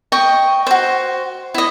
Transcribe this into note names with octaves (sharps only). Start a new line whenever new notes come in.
D#5 G5 C#6
F#4 C5
E4 D#5